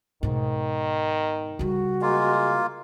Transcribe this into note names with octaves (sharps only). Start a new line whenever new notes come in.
G#2 B2 D#3
C#3 G3 F#4
G#3 A#3 F4